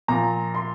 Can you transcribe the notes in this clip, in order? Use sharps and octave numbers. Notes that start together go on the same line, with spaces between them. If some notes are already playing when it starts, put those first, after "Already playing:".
A#2 F3 A#5
C6